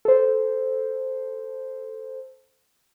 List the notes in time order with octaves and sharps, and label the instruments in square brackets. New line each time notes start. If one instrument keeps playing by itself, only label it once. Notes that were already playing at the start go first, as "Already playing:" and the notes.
[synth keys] A4 C5